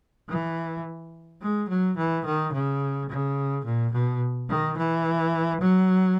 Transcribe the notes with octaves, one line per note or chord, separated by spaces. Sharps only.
E3
G#3
F#3
E3
D#3
C#3
C#3
A#2
B2
D#3
E3
F#3